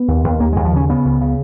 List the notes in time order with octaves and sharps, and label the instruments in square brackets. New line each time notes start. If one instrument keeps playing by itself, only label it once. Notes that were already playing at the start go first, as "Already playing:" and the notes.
Already playing: [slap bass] B3
D#2
D#2
D#2 A#3
D#2 G#3
F3
C#3 C#4
C#3 B3
C#2
C#3